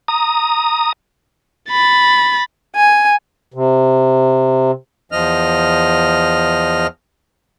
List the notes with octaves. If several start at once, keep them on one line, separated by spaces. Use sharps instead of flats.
A#5 D#6
B5 A6
G#5
C3
E2 F3 D#5 F6